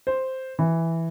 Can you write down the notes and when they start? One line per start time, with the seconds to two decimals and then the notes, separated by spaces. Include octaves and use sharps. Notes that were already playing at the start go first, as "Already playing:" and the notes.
0.07 C5
0.59 E3